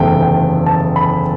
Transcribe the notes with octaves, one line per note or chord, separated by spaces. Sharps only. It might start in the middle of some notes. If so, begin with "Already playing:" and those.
Already playing: F#1 E2 C3 D#3 A3 G5
G5
A5
B5